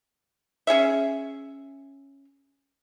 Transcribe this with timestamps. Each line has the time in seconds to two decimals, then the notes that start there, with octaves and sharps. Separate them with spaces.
0.67 C#4 G#4 C#5 E5